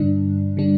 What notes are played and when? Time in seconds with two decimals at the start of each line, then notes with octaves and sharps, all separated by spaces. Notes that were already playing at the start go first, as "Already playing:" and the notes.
Already playing: G2 D3 G3 D4
0.57 D3 G3 D4